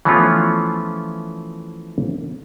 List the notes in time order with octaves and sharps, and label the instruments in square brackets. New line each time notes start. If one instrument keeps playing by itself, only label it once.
[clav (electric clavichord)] E3 F3 A3 B3 C#4 F4